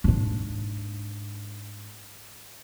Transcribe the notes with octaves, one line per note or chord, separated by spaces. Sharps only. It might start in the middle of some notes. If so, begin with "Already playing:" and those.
G#2 D4